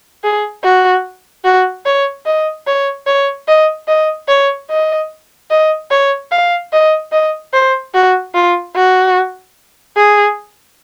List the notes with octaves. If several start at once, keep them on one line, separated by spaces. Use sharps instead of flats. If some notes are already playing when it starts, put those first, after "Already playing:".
G#4
F#4
F#4
C#5
D#5
C#5
C#5
D#5
D#5
C#5
D#5
D#5
C#5
F5
D#5
D#5
C5
F#4
F4
F#4
G#4